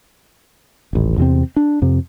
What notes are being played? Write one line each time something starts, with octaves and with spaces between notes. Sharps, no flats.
D#1 A1
E2 C3 C4
D4
F2 C3